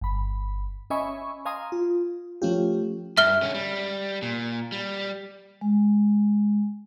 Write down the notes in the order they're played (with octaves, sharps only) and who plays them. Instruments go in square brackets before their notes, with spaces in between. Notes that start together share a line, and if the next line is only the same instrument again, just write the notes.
[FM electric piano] G1 B5
C#4 D#5 E5 G#5 B5 C#6
D#5 F5 G#5 A#5 C6 D#6
F4
F3 A3 C#4 F4 G4
[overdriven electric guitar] G2 [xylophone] E5 F6 G7
[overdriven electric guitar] D3 C#4
G3
A#2
G3
[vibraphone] G#3